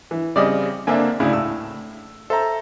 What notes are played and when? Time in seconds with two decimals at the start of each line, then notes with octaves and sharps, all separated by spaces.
0.11 E3
0.36 C#3 G3 C4 D5 D#5 D#6
0.87 D3 A#3 C4 D4 E5 G#5
1.20 D2 C#3 E4
1.33 A2 E6
2.30 A4 C5 E5 A#5